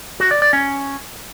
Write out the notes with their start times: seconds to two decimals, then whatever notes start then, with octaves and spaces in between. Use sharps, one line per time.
0.20 F#4
0.31 D5
0.42 D5
0.53 C#4